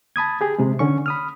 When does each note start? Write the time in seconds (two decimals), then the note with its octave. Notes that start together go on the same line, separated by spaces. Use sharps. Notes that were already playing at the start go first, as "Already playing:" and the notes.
0.16 A5 B5 D#6 G#6
0.41 G4 G#4
0.59 C3 G#3
0.79 D3 C#4 C#6
1.06 B5 D#6 F6